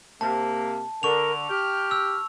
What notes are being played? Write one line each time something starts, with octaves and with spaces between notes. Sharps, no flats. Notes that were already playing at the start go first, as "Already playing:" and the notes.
C3 A#3 A5
D3 A#4 C#6 F7
G4 F6
E6